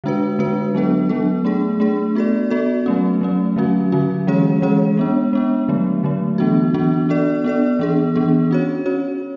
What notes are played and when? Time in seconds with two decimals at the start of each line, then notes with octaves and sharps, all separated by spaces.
0.04 D3 G#3 D4 F#4 B4
0.39 D3 G#3 D4 F#4 B4
0.75 F#3 B3 D4 A4
1.09 F#3 B3 D4 A4
1.45 A3 D4 G#4
1.80 A3 D4 G#4
2.15 B3 F#4 A4 D5
2.50 B3 F#4 A4 D5
2.86 F#3 A3 C#4
3.21 F#3 A3 C#4
3.56 D3 F#3 C#4 F#4
3.92 D3 F#3 C#4 F#4
4.27 E3 G#3 C#4 G#4 C#5
4.62 E3 G#3 C#4 G#4 C#5
4.97 G#3 B3 D4
5.33 G#3 B3 D4
5.68 D3 F#3 A3
6.04 D3 F#3 A3
6.38 E3 B3 D4 F#4
6.74 E3 B3 D4 F#4
7.09 B3 D4 A4 D5
7.44 B3 D4 A4 D5
7.79 E3 B3 D4 G#4
8.15 E3 B3 D4 G#4
8.51 C#4 F#4 C#5
8.86 C#4 F#4 C#5